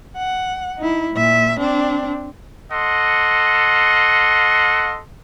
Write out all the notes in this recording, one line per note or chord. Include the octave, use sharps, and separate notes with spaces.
F#5
D#4 E4
A#2 E5
C4 D4
A4 D#5 F#5 C6